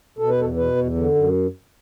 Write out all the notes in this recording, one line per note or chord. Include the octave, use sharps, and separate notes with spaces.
B2 A4
B4
E2 A4
B2 B4
E2
D3
F#2